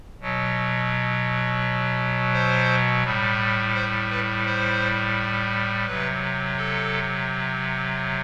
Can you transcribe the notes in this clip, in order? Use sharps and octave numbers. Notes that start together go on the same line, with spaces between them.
B2 F#3
C5
A2 G3
C5
B4
C5
C3 F#3 B4
A4